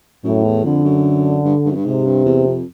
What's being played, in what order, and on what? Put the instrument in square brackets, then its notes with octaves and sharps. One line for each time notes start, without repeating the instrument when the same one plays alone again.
[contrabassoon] F#2 [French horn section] A2
[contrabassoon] E2
[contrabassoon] F2 [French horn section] D3
[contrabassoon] F#2
G2
G2
F#2
G2
[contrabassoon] G#2 [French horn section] C3
[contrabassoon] G2
E2
F2